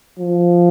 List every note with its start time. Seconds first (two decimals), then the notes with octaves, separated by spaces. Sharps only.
0.19 F3